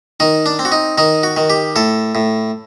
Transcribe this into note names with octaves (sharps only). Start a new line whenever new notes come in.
D#3 D#4
D4
C4
F#4
D#4
D#3 D#4
F#4
D#3
G4
A2 A4
A2